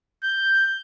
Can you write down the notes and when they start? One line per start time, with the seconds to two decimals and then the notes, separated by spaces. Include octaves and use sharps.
0.24 G6